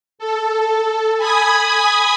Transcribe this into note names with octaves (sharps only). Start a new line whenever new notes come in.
A4
G#5 B5 D#6 G#6